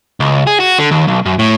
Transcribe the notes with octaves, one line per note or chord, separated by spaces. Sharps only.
C#2
G#4
F#4
D3
D#2
B1
F#2
A2